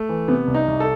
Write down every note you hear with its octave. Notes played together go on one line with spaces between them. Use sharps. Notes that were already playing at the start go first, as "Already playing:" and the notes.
Already playing: A3
E3
C3 B3
C2
D#4
C2
A4